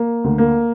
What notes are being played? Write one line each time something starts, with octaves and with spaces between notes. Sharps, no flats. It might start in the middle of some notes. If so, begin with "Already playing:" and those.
Already playing: A#3
D2
A#3